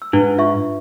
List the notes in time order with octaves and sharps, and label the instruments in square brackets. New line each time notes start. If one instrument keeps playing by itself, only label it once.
[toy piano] E6
[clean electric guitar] G#2 [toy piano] D4 E4 B4
[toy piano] F4 E5 C#6